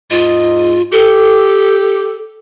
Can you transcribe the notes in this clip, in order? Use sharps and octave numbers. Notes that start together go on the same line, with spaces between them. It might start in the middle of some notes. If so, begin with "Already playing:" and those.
G#2 F4 D#5
G4 A4